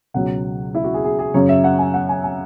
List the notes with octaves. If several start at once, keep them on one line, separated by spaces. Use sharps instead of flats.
C#2 B2 F#3 F#5
E4
F#4
G#4
G#4
G#4
F#2 C#3 F#3 C#5
E5
F#5
G#5
F#5
G#5
G#5